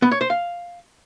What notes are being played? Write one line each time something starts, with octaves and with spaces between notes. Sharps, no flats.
B3
C#5
C5
F5